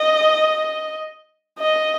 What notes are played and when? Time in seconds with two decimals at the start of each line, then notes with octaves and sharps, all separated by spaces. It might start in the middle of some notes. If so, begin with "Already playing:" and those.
Already playing: D#5
1.59 D#5